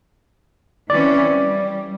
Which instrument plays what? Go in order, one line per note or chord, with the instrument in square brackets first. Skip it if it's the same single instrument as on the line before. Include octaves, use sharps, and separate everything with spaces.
[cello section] E3 C4 C#4 [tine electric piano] D5
[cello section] G3